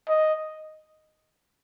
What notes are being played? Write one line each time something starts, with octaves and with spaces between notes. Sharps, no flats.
D#5